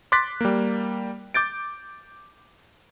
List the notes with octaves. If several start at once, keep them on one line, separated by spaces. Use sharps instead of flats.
C6 D6 F#6 A6 B6
G3 A#3
D6 G6 A6 D7